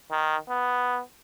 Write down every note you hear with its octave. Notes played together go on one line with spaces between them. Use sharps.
D#3
B3